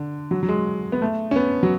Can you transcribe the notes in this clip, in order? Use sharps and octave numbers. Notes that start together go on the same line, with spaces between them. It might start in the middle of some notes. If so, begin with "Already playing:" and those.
Already playing: D3
F#3
F#3
G#3
B3
A3
C#4
B3
F#3